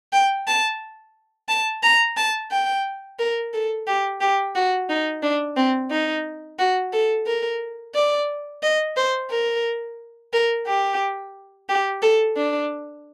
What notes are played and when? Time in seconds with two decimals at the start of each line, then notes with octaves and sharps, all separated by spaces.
0.13 G5
0.47 A5
1.49 A5
1.83 A#5
2.17 A5
2.51 G5
3.19 A#4
3.53 A4
3.87 G4
4.21 G4
4.55 F#4
4.89 D#4
5.23 D4
5.56 C4
5.91 D#4
6.59 F#4
6.93 A4
7.27 A#4
7.95 D5
8.63 D#5
8.97 C5
9.30 A#4
10.33 A#4
10.67 G4
11.69 G4
12.02 A4
12.36 D4